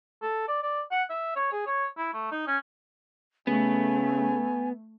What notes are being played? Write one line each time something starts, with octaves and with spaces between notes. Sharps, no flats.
A4
D5
D5
F#5
E5
C#5
G#4
C#5
E4
A3
D#4
C#4
C#3 A3 B3 G#5